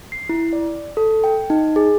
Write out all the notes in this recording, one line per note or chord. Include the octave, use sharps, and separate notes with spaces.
C7
E4
D5
A4
G5
D#4
G#4